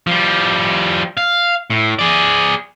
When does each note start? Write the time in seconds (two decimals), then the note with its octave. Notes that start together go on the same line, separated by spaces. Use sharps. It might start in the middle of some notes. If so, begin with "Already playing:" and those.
0.07 F3 G3
1.17 F5
1.70 A2
1.99 G#4 D5